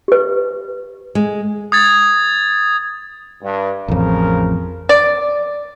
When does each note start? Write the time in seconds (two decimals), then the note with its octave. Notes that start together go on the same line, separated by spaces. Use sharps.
0.08 G4 B4
1.15 G#3
1.72 D#6 G#6 A6
3.42 G2
3.88 A1 F2 C#3 F3 A#4
4.89 D5